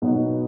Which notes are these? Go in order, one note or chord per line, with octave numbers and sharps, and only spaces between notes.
B2 F#3 B3 D#4